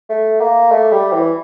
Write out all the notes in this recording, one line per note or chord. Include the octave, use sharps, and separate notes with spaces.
A3
A#3
A3
G3
E3